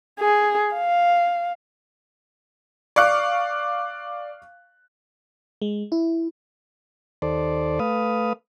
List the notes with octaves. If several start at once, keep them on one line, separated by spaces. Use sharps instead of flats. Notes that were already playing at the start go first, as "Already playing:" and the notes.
G#4
F5
D5 F5 C#6 D6 F#6
G#3
E4
D#2 A4 C5 D5
A3 B4 F5 D#6